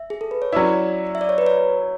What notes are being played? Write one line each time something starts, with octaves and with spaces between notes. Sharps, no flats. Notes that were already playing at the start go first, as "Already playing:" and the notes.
Already playing: E5
G#4
A4
B4
C#5
F#3 C#4 E4 D5
E5
D5
C#5
B4
C#5